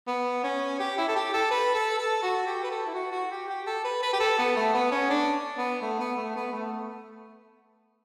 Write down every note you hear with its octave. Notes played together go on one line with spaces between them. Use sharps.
B3
C#4
G4
E4
A4
G4
A4
B4
A4
A4
F#4
G4
B4
A4
E4
F#4
F#4
G4
G4
A4
B4
B4
G4
A4
B3
A3
B3
C#4
D4
B3
A3
B3
A3
B3
A3